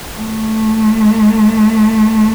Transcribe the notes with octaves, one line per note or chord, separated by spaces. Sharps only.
A3